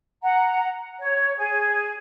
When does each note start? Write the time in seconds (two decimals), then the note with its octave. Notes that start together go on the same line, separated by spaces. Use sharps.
0.23 F#5 A#5
0.99 C#5
1.37 G#4